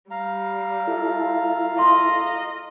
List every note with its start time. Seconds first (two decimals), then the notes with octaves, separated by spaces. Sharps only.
0.11 G3 F5 A#5
0.87 E4 F4 A4
1.79 D#5 C6